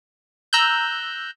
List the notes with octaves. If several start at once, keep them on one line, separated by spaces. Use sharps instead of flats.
A#5 E6 F#6 G6